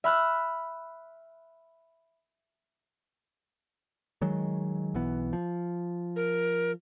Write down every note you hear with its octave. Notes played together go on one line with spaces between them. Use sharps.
E5 B5 F6 F#6
D#3 F#3 G#3
B1 E3 B3
F3
A#4